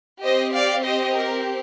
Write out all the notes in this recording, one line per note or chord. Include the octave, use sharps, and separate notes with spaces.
C4 G4 C5 D#5
D5 F5
C5 D#5
A#4